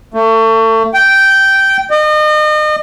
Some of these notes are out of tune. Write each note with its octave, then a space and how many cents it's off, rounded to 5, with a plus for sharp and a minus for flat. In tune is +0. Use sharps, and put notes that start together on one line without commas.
A3 +35
G5 -10
D#5 -35